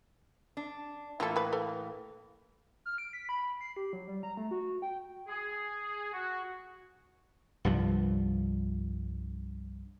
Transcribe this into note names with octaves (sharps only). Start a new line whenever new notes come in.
D4
A2 E3 A#3 F4 A4
A3 B4
A4 B4 F5
F6
D7
B6
B5
C7
G4
F#3
G3
A#5
A3
F#4
G5
G#4
F#4
C2 G2 F3